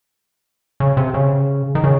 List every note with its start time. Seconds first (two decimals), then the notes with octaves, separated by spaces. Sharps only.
0.80 C#3
0.97 C3
1.14 C#3
1.75 D#3
1.84 C#3